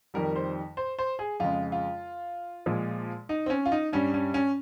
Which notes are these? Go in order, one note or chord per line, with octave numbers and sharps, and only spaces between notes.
F2 D#3 G3 A#4
C5
C5
C5
G#4
F2 C#3 G#3 F4
F4
A#2 F3 G#3
D#4
C4
C#4
F4
D#4
G2 G3 C#4
C#4
C#4